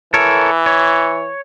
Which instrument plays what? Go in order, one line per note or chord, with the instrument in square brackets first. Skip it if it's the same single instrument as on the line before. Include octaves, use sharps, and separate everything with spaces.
[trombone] E3 [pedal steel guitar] A4 A#4 C#5
[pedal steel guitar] C#5